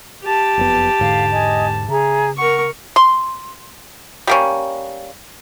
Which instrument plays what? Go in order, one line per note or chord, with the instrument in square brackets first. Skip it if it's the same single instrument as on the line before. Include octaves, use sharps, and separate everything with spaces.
[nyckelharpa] G4 A5
[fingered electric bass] F#1 F2 B3
[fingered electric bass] E1 G#2 D3 [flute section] F5
[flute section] D#5 G#5
[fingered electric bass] C#3 [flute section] G#4 E5 A#5
[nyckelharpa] A#4 C#6 [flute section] F#5
[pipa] C6
G3 A#3 C#4